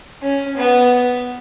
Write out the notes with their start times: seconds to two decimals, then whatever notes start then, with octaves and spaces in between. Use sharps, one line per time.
0.22 C#4
0.57 B3